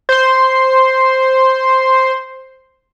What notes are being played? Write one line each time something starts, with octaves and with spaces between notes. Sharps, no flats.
C5 C6